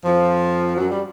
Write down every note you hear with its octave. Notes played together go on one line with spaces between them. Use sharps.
F2 F3
F#2 F#3
G3